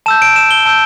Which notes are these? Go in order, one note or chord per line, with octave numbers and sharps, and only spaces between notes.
A5 E6 G6 E7
D7
E7
G7
A5 E6 G6 D7